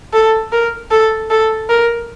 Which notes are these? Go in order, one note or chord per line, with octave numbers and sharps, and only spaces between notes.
A4
A#4
A4
A4
A#4